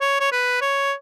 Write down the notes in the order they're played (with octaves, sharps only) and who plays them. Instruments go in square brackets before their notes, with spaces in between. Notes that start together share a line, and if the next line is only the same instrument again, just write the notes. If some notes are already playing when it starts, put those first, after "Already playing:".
[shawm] C#5
C#5
B4
C#5